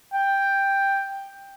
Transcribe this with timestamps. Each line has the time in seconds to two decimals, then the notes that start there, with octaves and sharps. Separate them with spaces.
0.14 G5